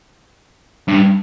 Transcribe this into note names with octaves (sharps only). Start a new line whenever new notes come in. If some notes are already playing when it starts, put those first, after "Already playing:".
G2